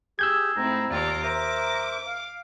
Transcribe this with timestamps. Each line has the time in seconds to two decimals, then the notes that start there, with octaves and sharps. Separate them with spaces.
0.19 G4 G#4 E6 G6 G#6
0.56 G#2 A3 C4 D#4 E4 A#5
0.90 D#2 F4 D5 A#5 D6
1.24 A#4 C5 E5 A#5 D6
2.06 F5